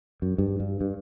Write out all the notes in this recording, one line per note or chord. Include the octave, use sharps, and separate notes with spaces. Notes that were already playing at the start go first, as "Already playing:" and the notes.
F#2
G2
G2
G2